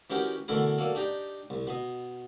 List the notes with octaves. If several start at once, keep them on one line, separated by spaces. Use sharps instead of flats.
E3 C#4 D#4 F#4 G4 A#4
B2 D3 E3 A3 E4 A#4
F#3 A#3 A4 D5
D4 D#4 G4 D5 A#5
C2
B2 D#5